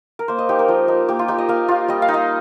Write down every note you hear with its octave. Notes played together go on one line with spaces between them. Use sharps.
A#4
A#3 C5
D#5
D#4 G4
A#4
F3
D#4
A#3 G4
F4
D#4 G4
D#5
A#3 F5
F4
G3 D#5
F5
D#4
D#5